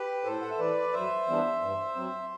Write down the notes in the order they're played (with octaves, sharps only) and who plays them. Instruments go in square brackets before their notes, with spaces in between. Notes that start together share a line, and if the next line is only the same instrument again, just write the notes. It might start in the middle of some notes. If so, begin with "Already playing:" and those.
Already playing: [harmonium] G4 B4
A2 A4 C5
F#5
E5
E3 A3 B4 D5
F#2 C5 E5
E3 G3 B3 D4
G2
F#3 C4